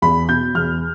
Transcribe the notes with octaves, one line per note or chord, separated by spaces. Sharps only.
E2 B5
B2 G6
E2 F6